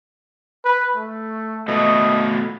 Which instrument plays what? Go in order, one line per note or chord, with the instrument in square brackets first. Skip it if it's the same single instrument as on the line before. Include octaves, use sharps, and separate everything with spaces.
[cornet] B4
A3
[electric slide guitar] B2 A3 [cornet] D#5